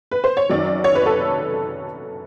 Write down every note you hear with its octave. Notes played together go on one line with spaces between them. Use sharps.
B4
C5
C#5
F#2 D#3 F#3 D5
C#5
B4
A4